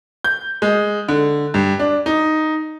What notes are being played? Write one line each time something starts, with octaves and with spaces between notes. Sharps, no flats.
G6
G#3
D3
G2
D4
D#4